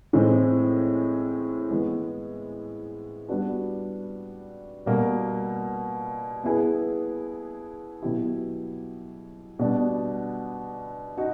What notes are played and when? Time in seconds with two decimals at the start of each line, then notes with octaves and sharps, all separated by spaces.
0.13 A2 E3 G#3 C4
1.71 E3 G#3 B3
3.29 G3 B3 D4 F#4 B4
4.86 B2 G3 A#3
6.44 B3 E4 G#4 B4
8.02 B2 F#3 B3 E4 G4
9.59 B2 G3 B3 D4
11.17 D#4 F#4